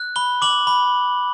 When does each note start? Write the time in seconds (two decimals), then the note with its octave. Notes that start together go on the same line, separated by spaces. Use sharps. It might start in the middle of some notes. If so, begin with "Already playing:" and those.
Already playing: F#6
0.16 B5 G7
0.42 D6 F#7
0.67 B5